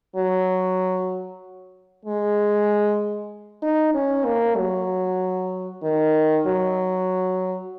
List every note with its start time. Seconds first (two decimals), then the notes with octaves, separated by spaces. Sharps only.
0.16 F#3
2.05 G#3
3.62 D#4
3.94 C#4
4.26 A#3
4.57 F#3
5.83 D#3
6.46 F#3